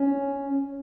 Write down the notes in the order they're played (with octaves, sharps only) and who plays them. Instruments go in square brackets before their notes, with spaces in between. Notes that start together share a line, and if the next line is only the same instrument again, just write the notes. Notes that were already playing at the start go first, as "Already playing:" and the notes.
Already playing: [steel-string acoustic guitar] C#4